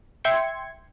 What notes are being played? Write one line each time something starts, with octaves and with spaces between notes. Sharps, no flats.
E5 G5 C6 G#6 C#7